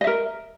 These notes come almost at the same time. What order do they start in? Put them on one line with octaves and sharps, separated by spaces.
D#5 E5 A#4